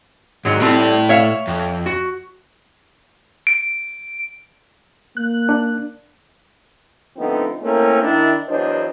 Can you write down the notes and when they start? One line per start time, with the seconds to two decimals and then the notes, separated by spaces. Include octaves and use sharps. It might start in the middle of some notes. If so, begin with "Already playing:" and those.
0.45 G#2 D#3 F#3 G#3
0.60 A2 G3 A3 C4 E4 A5
1.09 C#5 E5 F5
1.47 F2
1.86 F#4
3.47 D7
5.17 A#3 F#6
5.49 D4
7.17 D3 F3 A3 B3 C4 D#4
7.62 A3 A#3 C4 C#4 E4 A#4
8.02 D#3 D4 E4
8.49 E2 F#3 B3 D4 C5 D#5